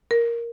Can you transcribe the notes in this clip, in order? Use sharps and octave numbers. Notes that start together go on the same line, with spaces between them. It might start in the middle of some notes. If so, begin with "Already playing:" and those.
A#4